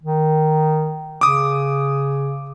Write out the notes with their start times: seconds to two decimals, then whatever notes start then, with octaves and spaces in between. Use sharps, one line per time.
0.03 D#3
1.21 C#3 D6 D#6